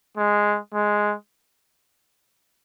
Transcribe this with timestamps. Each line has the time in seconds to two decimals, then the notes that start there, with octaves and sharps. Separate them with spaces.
0.18 G#3
0.75 G#3